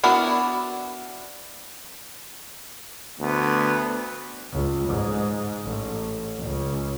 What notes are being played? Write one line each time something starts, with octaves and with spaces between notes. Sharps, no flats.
B3 D4 E4 F#4 A#4
D2 B3
C#2
G#2
A1
C#2